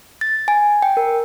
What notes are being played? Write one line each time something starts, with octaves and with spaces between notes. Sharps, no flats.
A6
G#5
G5
A#4